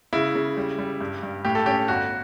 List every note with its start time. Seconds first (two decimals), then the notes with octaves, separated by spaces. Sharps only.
0.13 C#3 E4
0.35 C#3
0.57 G3
0.79 G3
1.01 G2
1.23 G2
1.45 A2 G4
1.55 A4
1.66 C#4 G4
1.88 G1 F#4